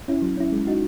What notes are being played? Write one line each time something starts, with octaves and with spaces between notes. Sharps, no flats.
C#4 E4
F#3
C#4 E4
G#3
D#4 F#4